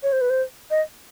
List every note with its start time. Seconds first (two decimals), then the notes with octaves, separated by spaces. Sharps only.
0.03 C#5
0.12 C5
0.21 B4
0.30 C5
0.71 D#5